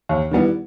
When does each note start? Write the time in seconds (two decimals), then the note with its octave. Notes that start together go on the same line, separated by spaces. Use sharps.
0.09 D#2
0.31 D#3 G3 B3 E4